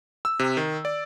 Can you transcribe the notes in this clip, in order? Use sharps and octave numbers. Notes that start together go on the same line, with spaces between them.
E6
C3
D#3
D5